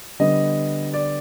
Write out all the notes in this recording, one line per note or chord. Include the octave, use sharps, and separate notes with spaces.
D3 G3 B3 D#5
D5